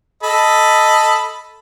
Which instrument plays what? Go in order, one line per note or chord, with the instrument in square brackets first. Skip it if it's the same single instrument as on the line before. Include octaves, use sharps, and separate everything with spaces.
[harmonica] A4 D#5 B5